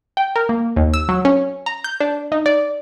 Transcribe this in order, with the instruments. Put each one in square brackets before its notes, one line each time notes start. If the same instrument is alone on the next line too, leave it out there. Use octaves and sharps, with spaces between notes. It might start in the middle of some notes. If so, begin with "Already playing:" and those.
[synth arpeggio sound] G5
A#4
A#3
D#2
E6
F#3
C#4
A#5
G6
D4
D#4
D5